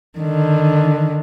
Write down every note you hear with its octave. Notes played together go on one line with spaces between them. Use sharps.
D3 D#3